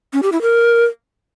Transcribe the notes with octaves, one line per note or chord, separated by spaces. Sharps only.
C#4
G4
E4
A#4